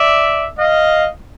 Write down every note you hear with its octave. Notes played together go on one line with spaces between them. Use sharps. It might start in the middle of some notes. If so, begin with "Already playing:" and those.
Already playing: D5 E5
D#5 F5